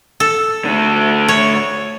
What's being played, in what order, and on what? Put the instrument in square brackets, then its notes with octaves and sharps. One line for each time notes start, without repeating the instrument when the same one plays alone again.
[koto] A4
[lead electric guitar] D3 A3
[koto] C#5